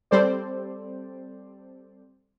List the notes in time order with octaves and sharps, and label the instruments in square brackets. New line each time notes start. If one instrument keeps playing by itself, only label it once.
[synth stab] G3 C4 A4 C5 D5